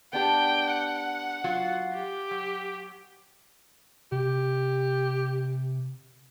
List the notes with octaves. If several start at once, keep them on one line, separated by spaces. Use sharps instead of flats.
B3 D4 G4 G5
F#5
F#3 F4 F#4
G4
F#3
C3 G4